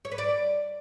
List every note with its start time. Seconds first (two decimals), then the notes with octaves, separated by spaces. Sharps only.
0.05 C#5
0.11 B4
0.18 D5